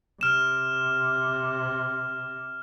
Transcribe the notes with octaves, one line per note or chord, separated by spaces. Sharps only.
C3 F6 E7